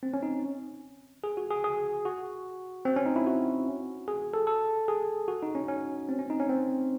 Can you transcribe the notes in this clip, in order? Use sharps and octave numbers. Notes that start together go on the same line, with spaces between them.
C4
C#4
D#4
G#4
F#4
G#4
G#4
F#4
C4
C#4
D#4
E4
F#4
G#4
A4
A4
G#4
F#4
D#4
C#4
C#4
C4
C#4
D#4
C#4
C4